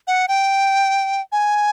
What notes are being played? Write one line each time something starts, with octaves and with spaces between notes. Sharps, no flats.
F#5
G5
G#5